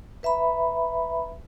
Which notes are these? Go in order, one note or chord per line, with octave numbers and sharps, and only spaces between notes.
B4 E5 A#5 B5